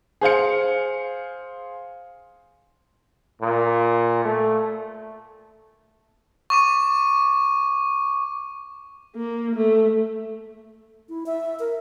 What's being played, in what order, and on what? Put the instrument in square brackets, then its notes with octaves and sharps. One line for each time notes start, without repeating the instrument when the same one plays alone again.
[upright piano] G#4 C5 F5 C#7
[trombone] A#2
A3
[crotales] C#6 D6 D#7
[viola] A#3
A3
[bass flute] E4
E5
A#4